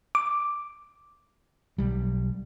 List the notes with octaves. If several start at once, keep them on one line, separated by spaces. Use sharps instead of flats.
D6
B1 G3